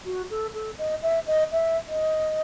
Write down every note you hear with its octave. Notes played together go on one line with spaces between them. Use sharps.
F#4
A4
A4
D#5
E5
D#5
E5
D#5